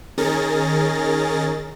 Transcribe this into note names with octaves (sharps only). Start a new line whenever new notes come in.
D#3 C#4 G#4 A#4 A6 A#6